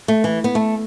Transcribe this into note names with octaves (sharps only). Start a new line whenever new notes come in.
A3
E3
B3
A3